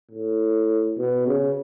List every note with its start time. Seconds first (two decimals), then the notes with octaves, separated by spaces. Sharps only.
0.11 A2
0.98 B2
1.27 C#3